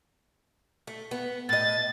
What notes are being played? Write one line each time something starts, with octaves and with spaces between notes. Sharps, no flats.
A3
B3
A2 D#5 A6